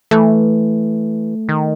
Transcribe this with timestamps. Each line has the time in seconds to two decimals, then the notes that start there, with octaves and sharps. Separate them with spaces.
0.11 E3 A3
1.49 D#3